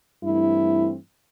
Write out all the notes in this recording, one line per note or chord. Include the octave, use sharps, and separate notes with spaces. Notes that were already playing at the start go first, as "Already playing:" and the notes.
G2 E3 A3 C4 E4